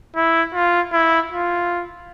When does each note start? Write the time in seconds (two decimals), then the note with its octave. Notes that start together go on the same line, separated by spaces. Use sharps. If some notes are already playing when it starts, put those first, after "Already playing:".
0.16 E4
0.54 F4
0.93 E4
1.31 F4